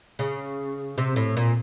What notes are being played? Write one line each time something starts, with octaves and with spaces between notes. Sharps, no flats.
C#3
C3
A2
A#2